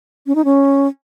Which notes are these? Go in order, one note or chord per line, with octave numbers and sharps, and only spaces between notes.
C#4
D#4
C#4